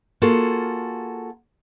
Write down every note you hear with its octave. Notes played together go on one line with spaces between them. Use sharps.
A#3 F4 F#4 G#4 A4